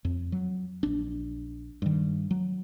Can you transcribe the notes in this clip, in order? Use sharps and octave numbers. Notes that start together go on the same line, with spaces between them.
F2
F#3
A#1 D4
G2 D#3
F#3